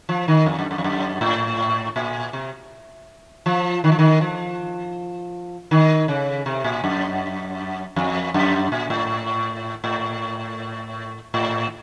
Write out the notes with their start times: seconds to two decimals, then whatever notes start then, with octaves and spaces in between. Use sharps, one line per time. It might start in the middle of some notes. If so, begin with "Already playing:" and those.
0.09 F3
0.28 D#3
0.46 F2
0.59 F#2
0.71 F#2
0.78 F2
0.84 F#2
1.21 A2
1.96 A#2
2.33 C3
3.46 F3
3.84 D#3
3.92 F3
3.99 D#3
4.21 F3
5.71 D#3
6.08 C#3
6.46 C3
6.64 A#2
6.84 F#2
7.96 F2
8.34 F#2
8.72 A#2
8.90 A2
9.84 A2
11.34 A2